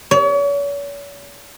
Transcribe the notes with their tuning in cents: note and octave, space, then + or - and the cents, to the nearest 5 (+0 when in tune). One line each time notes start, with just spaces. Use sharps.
C#5 +40